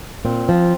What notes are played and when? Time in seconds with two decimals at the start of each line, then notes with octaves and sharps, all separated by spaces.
0.25 A#2 C4
0.49 F3